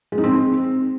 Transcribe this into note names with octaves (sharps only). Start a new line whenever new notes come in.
G#3
D#4
C4